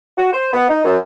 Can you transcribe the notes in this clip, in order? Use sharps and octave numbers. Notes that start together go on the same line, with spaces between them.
F#4
C5
B3
D#4
F#2